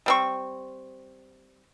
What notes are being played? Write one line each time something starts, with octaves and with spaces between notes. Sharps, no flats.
G3 C4 C#6